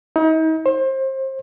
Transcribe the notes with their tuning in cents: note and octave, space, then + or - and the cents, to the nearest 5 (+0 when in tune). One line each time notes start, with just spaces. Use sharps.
D#4 +40
C5 +30